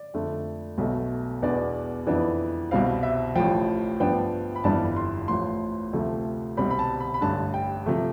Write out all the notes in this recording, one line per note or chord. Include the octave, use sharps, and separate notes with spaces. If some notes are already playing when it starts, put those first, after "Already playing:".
Already playing: D5
F2 D3 A3
B1 B2 A3
E2 B2 B3 D4 D5
F2 E3 B3 D4
C2 B2 G3 C4 F5
E5
A1 A2 F3 G5
G2 F3 B3 D4 G5
B5
G1 F2 E3 G3 D4 A5
C6
A1 A2 F3 C6
D2 C3 F3 A3
C2 B2 G3 C4 B5
B5
A5
B5
B5
A1 G2 D3 A5
G5
C3 F3 A3